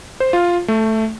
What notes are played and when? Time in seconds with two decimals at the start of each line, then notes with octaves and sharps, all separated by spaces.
0.20 C5
0.33 F4
0.68 A3